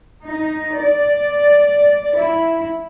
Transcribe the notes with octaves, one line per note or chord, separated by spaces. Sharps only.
D#4
D5
E4